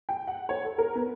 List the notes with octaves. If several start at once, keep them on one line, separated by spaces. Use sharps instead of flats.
G5
F#5
C#5
A4
A#4
B3